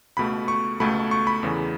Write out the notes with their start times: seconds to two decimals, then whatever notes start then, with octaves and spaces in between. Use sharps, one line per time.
0.17 C#2 B2 A3 B5
0.48 C#6
0.80 C#2 B2 A3 B5
1.11 C#6
1.27 B5
1.43 E2 C#3 E3